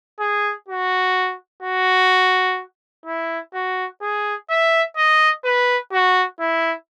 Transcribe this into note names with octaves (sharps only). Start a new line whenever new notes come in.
G#4
F#4
F#4
E4
F#4
G#4
E5
D#5
B4
F#4
E4